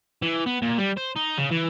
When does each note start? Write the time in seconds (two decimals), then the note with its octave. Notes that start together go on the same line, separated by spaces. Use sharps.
0.22 E3
0.46 B3
0.62 A#2
0.78 G3
0.97 C5
1.16 D#4
1.38 C#3
1.51 E3